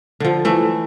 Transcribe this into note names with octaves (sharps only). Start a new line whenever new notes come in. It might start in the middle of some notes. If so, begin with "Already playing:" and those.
D3 F3
E3 A3